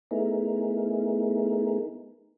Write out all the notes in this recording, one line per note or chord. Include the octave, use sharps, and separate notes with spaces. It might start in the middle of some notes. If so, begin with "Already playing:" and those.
A3 B3 D#4 E4 G#4 A#4